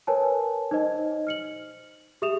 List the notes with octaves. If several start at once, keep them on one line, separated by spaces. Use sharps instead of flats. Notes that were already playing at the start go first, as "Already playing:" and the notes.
A#4 B4 C#5 G#5 A5
D#4 C5 D#5
F6 C#7 F#7
G4 G#4 E5 D#6 E7 F7